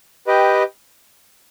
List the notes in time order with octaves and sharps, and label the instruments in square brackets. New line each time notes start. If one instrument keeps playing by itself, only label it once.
[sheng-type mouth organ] G4 B4 D#5 G5